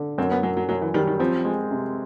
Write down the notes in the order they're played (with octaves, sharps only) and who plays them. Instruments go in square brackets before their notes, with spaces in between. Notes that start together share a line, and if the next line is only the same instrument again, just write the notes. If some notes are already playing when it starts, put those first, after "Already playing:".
Already playing: [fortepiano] D3
[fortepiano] F#2 [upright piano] C4
[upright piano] B3
[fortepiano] F#2 [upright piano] F#3
[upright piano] F#3
[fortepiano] F#2 [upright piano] F#3
[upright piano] E3
[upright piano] D#3 [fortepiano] G3
[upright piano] D#3
[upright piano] F3 [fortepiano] C4
[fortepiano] G#3
C3